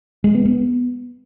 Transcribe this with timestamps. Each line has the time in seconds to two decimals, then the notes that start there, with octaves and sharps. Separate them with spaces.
0.24 G#3
0.35 B3
0.45 B3